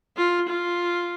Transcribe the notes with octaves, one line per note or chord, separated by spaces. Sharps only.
F4
F4